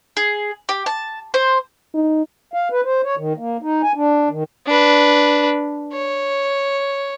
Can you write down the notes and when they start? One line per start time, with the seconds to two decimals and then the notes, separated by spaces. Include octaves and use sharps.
0.17 G#4
0.69 G4
0.86 A5
1.34 C5
1.94 D#4
2.54 F5
2.72 B4
2.85 C5
3.04 C#5
3.18 D#3
3.37 A#3
3.62 D#4
3.83 G#5
3.95 D4
4.30 D#3
4.67 D4 B4
5.93 C#5